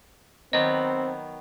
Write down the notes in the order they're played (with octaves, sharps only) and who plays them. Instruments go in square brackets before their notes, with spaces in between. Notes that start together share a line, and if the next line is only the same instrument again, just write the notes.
[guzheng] D#3 F#3 B3 [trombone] C4 [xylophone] D#5